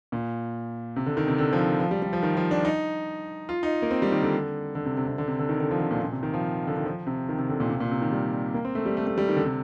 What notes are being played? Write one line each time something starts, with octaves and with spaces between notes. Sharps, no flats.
A#2
C3
D3
D#3
C3
D3
F3
D#3
F3
G3
G3
F3
D#3
F3
D4
D#4
F4
D#4
A#3
C4
G3
D#3
D3
D3
C3
C3
C3
D3
C3
D3
D#3
D3
F3
D3
A#2
A#2
C3
D#3
F3
D3
D#3
F3
C3
D#3
C3
D3
A#2
C3
A#2
C3
D#3
G3
A#3
C4
A3
G3
A3
A3
G3
D#3
D3
C3